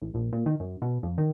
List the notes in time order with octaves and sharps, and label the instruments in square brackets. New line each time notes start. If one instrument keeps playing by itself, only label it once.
[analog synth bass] A1
A#1
A#2
D#3
F#2
B2
F2
D#3